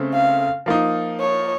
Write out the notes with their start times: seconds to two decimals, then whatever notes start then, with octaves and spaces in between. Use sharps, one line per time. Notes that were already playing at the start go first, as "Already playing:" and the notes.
Already playing: C#3 A3 C4
0.13 F5
0.66 F3 A#3 D#4
1.20 C#5